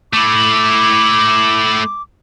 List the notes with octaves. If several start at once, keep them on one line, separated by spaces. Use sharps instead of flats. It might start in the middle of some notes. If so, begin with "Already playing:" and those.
A3 E4 D6